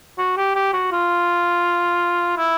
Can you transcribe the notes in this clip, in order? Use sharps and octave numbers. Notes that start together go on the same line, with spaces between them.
F#4
G4
G4
F#4
F4
E4